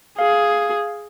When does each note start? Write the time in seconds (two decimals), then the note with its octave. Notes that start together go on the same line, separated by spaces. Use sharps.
0.19 G#4 F5